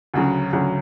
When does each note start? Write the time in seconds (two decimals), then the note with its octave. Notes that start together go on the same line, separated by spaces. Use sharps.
0.14 D2 C#3 F#3
0.53 D2 C#3 F#3